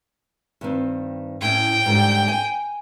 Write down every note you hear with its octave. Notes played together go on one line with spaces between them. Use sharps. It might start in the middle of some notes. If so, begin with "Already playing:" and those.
G2 D#3 C4
A2 C#4 G5
G#2 D3 G3
G#5